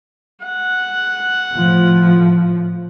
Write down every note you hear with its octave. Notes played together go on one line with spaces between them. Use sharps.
F#5
A2 F3